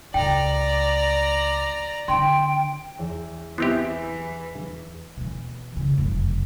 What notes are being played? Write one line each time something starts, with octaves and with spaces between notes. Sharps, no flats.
C#2 A3 D5 G5 A#5
D3 G5 C6
E2 E7
E3 B3 C4 E4 G4 E5
B2 E3
C#3
F1 F#2